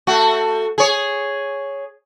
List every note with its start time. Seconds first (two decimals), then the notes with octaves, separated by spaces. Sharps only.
0.07 A3 F#4
0.78 G#4 C#5